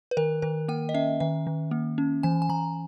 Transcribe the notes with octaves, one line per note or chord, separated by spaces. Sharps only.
B4
D#3 A#4
D#3 A#4
A#3 G5
D#5
C#4 E5
D#3 E5
D#3
A#3
C#4
E3 G#5
G#5
E3 A#5